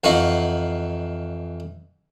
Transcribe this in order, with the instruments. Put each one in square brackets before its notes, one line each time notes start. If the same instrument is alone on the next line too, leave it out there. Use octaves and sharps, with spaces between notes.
[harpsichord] F2 E3 D#4 F5 F#5 C#6